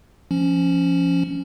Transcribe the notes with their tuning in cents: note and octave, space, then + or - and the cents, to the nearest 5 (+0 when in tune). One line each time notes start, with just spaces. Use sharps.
F3 -15 C#4 +0